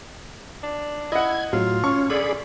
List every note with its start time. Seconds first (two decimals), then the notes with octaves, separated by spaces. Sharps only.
0.63 D4
1.12 E4 D#5 F#5 G#6
1.53 A2 F#3 F4
1.84 C#4 C#6
2.10 D3 G#4 D5 B5